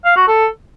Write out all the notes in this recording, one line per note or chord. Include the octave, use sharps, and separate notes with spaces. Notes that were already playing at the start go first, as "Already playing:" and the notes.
F5
F#4
A4